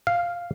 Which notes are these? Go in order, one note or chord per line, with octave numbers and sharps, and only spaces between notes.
F5